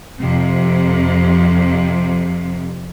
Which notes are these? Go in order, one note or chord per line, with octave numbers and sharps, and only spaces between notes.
F2 C3